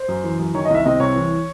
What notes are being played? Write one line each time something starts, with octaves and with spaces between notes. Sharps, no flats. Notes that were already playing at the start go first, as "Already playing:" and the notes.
Already playing: C5
F#2
E3
F#2
D#3 C#5
D#5
C2 E5
C3 D#5
C2 C#5
E3